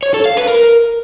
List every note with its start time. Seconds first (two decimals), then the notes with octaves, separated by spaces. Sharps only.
0.03 C#5
0.14 A4
0.25 F5
0.37 B4
0.48 A#4